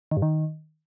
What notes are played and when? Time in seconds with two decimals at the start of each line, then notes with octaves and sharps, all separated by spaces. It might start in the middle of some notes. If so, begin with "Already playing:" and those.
0.11 D#3
0.17 G2
0.22 D#3